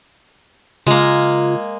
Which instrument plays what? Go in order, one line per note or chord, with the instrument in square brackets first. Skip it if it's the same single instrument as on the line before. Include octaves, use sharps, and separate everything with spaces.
[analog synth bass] C#3 [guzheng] G#3 A#3 [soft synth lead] F4